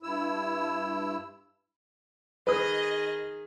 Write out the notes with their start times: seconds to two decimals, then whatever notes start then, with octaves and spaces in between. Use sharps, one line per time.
0.03 G2 E4 E6
2.47 D#3 G#4 B4 D#5 D#6 A#6